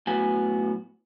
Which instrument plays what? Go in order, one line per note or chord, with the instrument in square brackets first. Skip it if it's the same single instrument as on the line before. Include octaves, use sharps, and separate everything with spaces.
[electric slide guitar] F#2 A2 B3 F#4 G#5